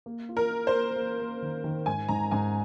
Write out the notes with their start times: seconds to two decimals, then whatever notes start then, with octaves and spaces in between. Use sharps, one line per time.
0.06 A#3
0.29 F4
0.37 A#4
0.51 F4
0.67 C5
0.75 A#3
0.96 A#3
1.20 A#3
1.42 D#3
1.64 D#3
1.86 G#2 G#5
2.08 G#2 A#5
2.31 G#2 G#5